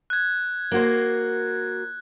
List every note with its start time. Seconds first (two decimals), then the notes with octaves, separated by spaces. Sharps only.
0.10 F#6 G#6
0.72 A#3 F#4 C5